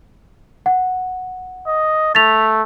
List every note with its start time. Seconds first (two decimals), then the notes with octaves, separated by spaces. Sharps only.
0.66 F#5
1.67 D#5
2.15 A3 A6 B6 F7